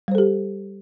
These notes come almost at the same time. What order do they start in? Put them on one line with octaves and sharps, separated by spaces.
G3 C5 A4 G4